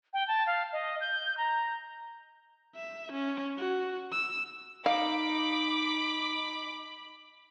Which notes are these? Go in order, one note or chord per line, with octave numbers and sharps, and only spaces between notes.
G5
A5
F5
D#5
G6
A#5
E5
C#4
F#4
E6
D#4 F5 B5 D6